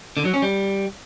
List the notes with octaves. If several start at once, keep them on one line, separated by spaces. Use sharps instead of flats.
D3
F#3
C#4
G3